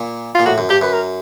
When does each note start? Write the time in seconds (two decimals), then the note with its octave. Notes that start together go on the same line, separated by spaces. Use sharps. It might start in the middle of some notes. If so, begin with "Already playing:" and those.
Already playing: A#2
0.35 A#2 F4
0.45 A2 F#4
0.58 F#2
0.69 G2 G4
0.81 F#2 B4
0.93 A#4